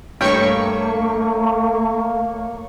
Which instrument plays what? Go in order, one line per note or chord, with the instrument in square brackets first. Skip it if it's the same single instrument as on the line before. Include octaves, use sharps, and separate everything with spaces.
[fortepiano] G2 G5 [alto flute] A3 [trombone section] A#3 [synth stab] C#5 C#6